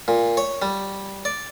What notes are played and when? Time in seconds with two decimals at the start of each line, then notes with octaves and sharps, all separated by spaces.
0.08 A#2
0.37 C#5
0.62 G3
1.25 D5